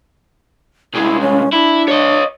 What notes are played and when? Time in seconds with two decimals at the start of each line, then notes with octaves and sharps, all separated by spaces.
0.94 C2 G#3 E4
1.21 C#4
1.52 D4 E4
1.88 C#5 D#5